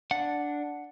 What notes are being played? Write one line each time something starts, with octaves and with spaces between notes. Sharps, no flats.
D4 F#5